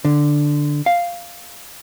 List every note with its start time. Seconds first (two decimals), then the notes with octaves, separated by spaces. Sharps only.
0.05 D3
0.86 F5